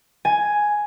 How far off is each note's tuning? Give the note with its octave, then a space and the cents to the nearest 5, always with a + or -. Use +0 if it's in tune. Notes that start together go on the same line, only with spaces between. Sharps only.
G#5 +5